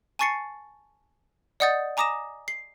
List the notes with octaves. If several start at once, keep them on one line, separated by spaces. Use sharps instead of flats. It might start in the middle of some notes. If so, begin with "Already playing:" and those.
G#5 A5 C#6 A6 C7 C#7
D5 D#5 F#5 D#6 G6 A6
G#5 A#5 D6 D#6 A#6 E7
C7